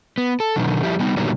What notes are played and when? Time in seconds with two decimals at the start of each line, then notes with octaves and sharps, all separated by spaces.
0.18 B3
0.40 A4
0.56 B2 D3 D#3 F#3
0.83 F3 G3 E4 G4
1.00 G3 B3 D#4
1.17 A#2 D3 D#3 F#3 G3 B3